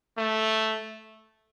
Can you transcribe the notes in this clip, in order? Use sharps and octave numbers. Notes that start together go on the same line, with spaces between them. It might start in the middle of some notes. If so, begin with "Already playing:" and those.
A3